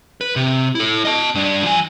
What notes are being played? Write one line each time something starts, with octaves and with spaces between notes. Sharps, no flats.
B4
C3
E4 A4
D#5 A5
G2 D4
F3 G#5